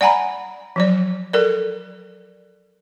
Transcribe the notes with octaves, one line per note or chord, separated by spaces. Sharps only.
D5 F#5 G#5 A#5 B5
F3 F#3 D5
A4 A#4 D5